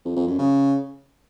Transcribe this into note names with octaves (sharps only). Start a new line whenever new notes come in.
F2
F2
F#2
C#3